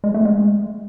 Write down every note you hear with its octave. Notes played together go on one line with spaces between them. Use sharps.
G#3
A3
G#3